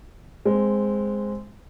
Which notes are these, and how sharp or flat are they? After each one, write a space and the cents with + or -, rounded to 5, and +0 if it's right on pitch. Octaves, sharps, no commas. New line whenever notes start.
G#3 -5 C4 +0